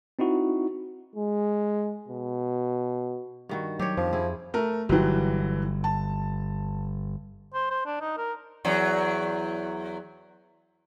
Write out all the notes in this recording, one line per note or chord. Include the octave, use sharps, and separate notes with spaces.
C4 D#4 E4 F#4
G#3
B2
G2 D#3 F#4
F#3 G4 C#5
F2 F3
C4 E4 G#4
A3 A#4
G1 E3 F#3 G4
A5
C5
C5
D4
D#4
A#4
E2 F#3